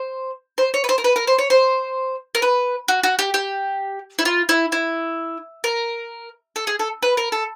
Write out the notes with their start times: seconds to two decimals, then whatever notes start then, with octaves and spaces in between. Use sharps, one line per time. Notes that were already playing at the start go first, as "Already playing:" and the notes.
Already playing: C5
0.58 C5
0.74 C#5
0.84 B4
0.89 C5
0.98 A#4
1.04 B4
1.16 A#4
1.27 C5
1.39 C#5
1.50 C5
2.35 A#4
2.42 B4
2.88 F#4
3.03 F#4
3.19 G4
3.34 G4
4.19 E4
4.25 F4
4.49 E4
4.72 E4
5.64 A#4
6.56 A4
6.67 G#4
6.79 A4
7.02 B4
7.17 A#4
7.32 A4